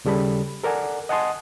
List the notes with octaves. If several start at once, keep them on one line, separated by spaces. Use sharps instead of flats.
D#2 C#3 G3 A4 B5
A4 A#4 D5 F#5 G#5
D#5 F#5 G#5 A5 C6 D#6